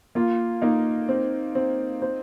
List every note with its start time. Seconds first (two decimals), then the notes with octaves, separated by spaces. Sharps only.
0.15 A#3 F4
0.62 A#3 D#4
1.09 C4
1.55 C4
2.02 C5